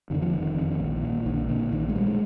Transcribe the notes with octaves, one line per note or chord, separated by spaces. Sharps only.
F2 D3 D#3
F3
F1 D#3
F2 D3
A#1
A#2
A#1 D#3
D3
A#2 D3
A#1 D#3
G#3
A#2 G3
G#3